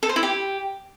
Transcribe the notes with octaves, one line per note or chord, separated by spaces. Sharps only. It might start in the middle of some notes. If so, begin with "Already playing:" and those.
A4
C5
E4
G4